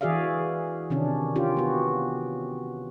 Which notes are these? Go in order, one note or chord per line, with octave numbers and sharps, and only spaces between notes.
E3 F#4 G#4 D5 E5 F5
C3 D#3 C#4 D4
C#4 F4 G4
B3 F#4